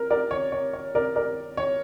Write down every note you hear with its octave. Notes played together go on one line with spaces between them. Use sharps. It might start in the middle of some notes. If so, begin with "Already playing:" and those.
Already playing: A#4
A#4 D5
C#5
C#5
C#5
A#4 D5
A#4 D5
C#5